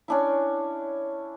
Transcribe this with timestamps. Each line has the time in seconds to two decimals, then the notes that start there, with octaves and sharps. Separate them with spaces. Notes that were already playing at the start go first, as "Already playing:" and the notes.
0.08 C#4 D4 E4